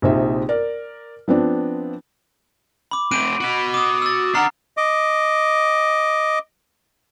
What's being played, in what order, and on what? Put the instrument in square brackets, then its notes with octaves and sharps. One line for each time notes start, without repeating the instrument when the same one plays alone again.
[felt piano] A#1 C3 D#4 C5 E5
A#4 D5
F3 B3 C4 D4
[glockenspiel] B5 D6
[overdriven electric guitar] A3 C4 [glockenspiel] F#6 D7 D#7
[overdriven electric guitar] F#4 B5
[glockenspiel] D6 D#6
E6 A6
[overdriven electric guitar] D4 F#5 [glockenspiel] A#5 F6 C7
[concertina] D#5 D6